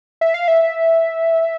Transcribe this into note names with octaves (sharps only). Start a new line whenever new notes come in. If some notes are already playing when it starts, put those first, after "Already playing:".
E5
F5
E5